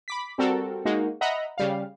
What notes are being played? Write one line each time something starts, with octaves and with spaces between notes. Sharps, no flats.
B5 D6 B6
G3 C4 F#4 A4 A#4
G#3 A#3 D#4 F#4
D#5 E5 F#5 A#5 B5
C#3 G3 F5